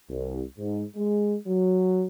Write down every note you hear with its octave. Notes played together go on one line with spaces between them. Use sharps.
C2
G#2
G#3
F#3